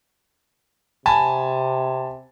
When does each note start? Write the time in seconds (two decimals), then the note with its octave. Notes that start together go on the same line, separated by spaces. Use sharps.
1.06 C3 G#5 A5 B5